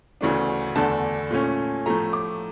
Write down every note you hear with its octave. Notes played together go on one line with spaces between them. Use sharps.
D2 C#3 E3 A3 D4
E2 D3 A3 D4 A5
A#2 A3 C#4
A2 F3 A3 A#5
D6